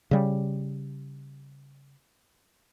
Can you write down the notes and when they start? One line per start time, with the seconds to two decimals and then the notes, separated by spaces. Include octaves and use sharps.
0.11 C#3 G3